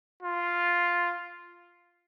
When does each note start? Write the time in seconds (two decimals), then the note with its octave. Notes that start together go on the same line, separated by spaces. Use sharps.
0.23 F4